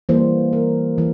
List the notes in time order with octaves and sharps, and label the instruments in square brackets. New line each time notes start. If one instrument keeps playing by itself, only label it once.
[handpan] E3 G3 A#3 C5
A#4
E3